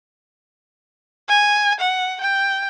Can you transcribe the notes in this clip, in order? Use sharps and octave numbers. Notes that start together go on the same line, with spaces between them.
G#5
F#5
G5